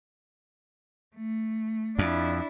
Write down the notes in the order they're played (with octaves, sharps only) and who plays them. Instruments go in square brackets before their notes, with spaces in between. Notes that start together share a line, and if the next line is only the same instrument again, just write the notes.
[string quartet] A3
[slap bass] F2 [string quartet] D4 E4